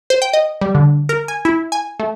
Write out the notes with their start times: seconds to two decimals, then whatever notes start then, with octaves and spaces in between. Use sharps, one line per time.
0.10 C5
0.22 G5
0.33 D#5
0.61 G3
0.75 D3
1.09 A#4
1.28 G#5
1.45 E4
1.72 G#5
2.00 A3